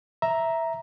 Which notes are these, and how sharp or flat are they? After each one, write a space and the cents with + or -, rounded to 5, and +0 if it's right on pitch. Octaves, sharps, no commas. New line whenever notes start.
E5 +0 A#5 +5